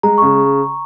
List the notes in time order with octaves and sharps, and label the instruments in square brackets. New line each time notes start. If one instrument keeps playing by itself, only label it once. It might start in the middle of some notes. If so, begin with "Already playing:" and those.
[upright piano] G#3 [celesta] A#5
[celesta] C#6
[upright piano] C#3